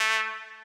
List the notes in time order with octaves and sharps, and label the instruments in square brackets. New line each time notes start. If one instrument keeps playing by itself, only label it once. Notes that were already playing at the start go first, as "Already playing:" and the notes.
Already playing: [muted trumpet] A3